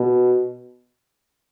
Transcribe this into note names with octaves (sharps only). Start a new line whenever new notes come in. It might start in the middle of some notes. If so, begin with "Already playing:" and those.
Already playing: B2